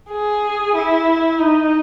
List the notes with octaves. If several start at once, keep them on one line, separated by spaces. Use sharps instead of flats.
G#4
E4
D#4